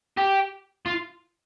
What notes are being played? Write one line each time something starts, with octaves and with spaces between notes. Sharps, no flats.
G4
F4